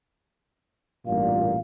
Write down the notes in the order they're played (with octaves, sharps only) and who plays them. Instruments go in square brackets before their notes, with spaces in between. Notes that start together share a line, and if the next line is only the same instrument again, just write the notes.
[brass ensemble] A1 G2 A#2 [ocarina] F5